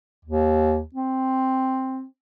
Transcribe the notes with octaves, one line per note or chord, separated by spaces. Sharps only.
D#2
C4